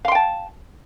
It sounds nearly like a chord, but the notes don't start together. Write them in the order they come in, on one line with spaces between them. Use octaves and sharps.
F5 C6 G5 A5